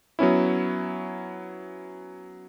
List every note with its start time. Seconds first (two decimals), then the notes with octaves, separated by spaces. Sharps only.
0.19 F#3 B3 C#4 E4